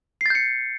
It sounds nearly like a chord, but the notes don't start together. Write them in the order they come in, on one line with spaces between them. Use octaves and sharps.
C7 A6 G6 C#7